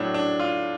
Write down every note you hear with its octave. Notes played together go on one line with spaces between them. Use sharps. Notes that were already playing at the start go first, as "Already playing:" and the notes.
Already playing: A2 F#3 D4
D4
F4